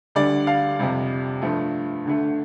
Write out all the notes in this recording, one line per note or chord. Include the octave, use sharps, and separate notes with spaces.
D2 D3 G3 D5
F5
F2 C3 G3
G2 F3 A3
D2 D3 A3